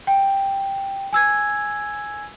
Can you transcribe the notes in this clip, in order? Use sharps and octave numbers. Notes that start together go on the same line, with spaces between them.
G5
G#5 E6 G#6